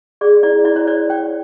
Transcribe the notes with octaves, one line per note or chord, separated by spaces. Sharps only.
G#4 D5
E4 D5
E4 D5
C#5
C#5 D5
C#5 G5